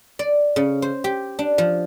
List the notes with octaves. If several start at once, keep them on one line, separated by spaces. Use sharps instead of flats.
D5
C#3
C5
G4
D4
F3